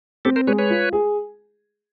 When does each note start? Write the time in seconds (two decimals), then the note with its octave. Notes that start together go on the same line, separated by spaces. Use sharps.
0.25 C4 G4 A4
0.36 A#4 C5
0.47 G#3 B4 C#5
0.59 B4 C#5
0.70 F4
0.93 G#4